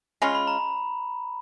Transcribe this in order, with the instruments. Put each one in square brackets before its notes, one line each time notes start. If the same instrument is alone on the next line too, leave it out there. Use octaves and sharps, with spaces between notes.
[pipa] G#3 C#4 F4 [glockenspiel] B5
[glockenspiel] B5
A#5